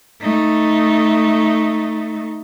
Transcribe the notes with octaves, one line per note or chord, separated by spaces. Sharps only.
A3 D#4